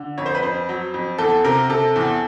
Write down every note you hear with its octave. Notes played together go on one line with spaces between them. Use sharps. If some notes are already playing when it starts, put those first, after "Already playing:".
Already playing: D3
F2 C#5
C5
B4
F2 C5
F#3
F2
E2 A4
C3 A#4
C3 A4
E2